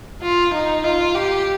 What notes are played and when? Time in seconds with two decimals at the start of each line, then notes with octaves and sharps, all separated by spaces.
0.22 F4
0.54 D#4
0.84 F4
1.15 G4